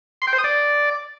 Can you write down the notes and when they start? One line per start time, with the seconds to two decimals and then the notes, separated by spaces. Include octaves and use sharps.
0.22 C6
0.27 G5
0.33 C5
0.38 D#6
0.44 D5